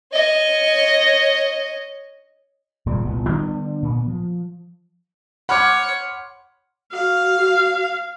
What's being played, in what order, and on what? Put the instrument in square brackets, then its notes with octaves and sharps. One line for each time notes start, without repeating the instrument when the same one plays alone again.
[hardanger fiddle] C#5 D#5
[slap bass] D#1 A#2 C#3 G3
G1 C2 A#2 B3
D3 G3 B3
A#2 A#3 B3
F3
[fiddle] C#5 [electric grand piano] F#5 D6 [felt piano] B5 C6 F6
[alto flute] F#4 [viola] F5